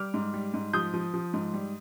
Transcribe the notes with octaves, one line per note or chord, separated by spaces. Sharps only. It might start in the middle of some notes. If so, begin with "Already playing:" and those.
Already playing: G3 D6 F6
G#2
G3
G#2
F3 D#6 G6
F3
F3
G#2
G3